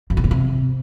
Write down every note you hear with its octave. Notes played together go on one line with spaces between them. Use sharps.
F#2
A#2
A2
C3